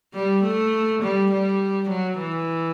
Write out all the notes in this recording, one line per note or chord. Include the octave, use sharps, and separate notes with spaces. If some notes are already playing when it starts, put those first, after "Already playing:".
G3
A3
G3
G3
F#3
E3